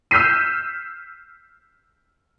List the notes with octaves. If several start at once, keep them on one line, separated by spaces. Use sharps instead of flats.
E6 F6 G6 B6 C7 D#7